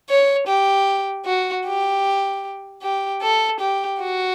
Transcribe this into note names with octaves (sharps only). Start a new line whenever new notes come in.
C#5
G4
F#4
G4
G4
A4
G4
F#4